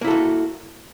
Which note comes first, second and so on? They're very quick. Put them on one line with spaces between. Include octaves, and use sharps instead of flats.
A#3 E4 A4 F#4